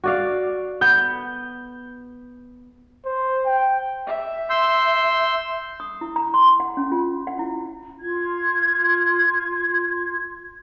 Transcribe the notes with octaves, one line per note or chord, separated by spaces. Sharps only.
F#4 D5 F5
B3 G6
C5
G5
E5
C6 E6 G6
D#6
E4
A#5
C6
F#5
C#4
F4
F#5
E4
F4 G#6